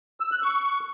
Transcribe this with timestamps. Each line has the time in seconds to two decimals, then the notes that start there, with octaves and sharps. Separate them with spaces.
0.20 E6
0.31 F#6
0.42 C#6